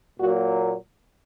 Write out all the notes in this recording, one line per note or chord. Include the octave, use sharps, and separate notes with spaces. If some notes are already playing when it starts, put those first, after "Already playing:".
A#2 F#3 A#3 F#4